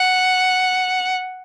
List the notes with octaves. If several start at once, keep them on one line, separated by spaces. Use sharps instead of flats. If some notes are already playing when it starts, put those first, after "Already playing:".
Already playing: F#5